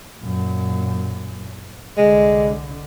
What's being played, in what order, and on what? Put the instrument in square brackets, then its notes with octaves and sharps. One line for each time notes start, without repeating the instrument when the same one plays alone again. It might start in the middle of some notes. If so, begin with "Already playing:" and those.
[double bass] F#2 A#2
[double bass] C2 D3 [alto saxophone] G#3